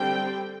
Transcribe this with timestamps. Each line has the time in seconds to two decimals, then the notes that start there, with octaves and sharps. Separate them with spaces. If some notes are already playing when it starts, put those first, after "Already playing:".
Already playing: D3 G3 C4 G5